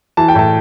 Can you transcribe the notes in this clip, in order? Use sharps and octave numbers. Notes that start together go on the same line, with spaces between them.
E3 A5
G5
A2 A5